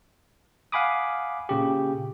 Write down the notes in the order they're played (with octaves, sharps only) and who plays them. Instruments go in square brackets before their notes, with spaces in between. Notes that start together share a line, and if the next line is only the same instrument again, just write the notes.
[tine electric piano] F5 F#5 G#5 B5 D6 D#6
A#2 C#3 G4